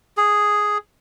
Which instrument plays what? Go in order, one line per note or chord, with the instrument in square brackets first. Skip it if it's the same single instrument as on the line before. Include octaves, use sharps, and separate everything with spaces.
[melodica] G#4